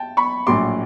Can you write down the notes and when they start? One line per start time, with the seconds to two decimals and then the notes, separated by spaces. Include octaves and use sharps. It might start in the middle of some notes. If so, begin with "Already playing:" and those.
Already playing: G5 A5
0.17 B5 C#6
0.47 A#1 A2 F#3 C6 D6